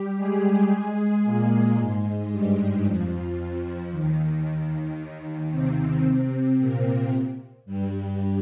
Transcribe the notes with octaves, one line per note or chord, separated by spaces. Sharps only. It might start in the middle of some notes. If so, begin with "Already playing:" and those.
Already playing: G3 G4
G#3 G#4
A#2 A#3
G#2 G#3
G2 G3
F2 F3
D#2 D#3
C3 C4
C3 C4
A#2 A#3
G2 G3